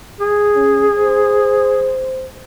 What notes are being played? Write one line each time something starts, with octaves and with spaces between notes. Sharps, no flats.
G#4
C#4
C5